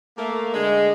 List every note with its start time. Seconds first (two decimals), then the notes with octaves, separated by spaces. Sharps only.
0.18 A3 A#3
0.53 D3 G#3